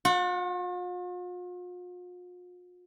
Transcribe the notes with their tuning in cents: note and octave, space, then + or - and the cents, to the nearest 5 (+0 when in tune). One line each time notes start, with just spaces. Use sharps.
F4 +45 F#5 +0